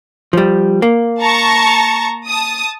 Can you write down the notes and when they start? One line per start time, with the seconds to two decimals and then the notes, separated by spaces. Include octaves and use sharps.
0.33 F3 G3
0.82 A#3
1.22 A5 A#5 C#6
2.28 A5 D#6